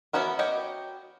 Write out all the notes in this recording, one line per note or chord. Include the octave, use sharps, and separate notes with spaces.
E3 B3 C#4 F#4 A#4
F#4 G4 C#5 D#5 G5